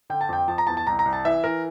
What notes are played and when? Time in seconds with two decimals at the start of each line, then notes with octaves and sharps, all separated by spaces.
0.10 D3 G5
0.21 A5
0.29 F2 G5
0.48 F3 A5
0.58 A#5
0.67 E2 A5
0.77 A5
0.87 C2 A#5
0.99 A#5
1.06 C2
1.13 A5
1.25 E3 E5
1.44 E3 A#4